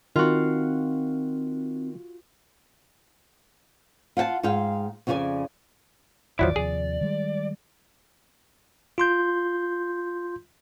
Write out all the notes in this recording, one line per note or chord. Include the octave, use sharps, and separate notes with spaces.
D#3 C4 F4 F#4
F4 F#5 G5 A5
G#2 F4 G#4 F5 G5
F2 C#3 F4 F#4 D5 G#5
A1 E2 D#3 F3 F#3 E4 D5
D#2 C3 F3 G#4
D#3 G3 G#3
F4 C6 G6